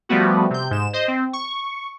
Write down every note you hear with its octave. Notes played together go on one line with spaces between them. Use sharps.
F3 G3 A3 B3 F#4
C3 G6
G#2 E7
C5 D#5
C4
C#6